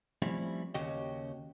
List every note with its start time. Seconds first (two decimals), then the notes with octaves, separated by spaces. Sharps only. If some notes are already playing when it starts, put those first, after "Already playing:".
0.22 F3 G3 A3 C4 C#4 E4
0.74 D#2 C#3 C#4 F#4 G4 D#5